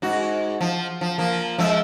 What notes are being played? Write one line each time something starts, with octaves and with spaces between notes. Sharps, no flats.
G#2 F#4
F3
F3
F3 A#3
F3 G#3 E5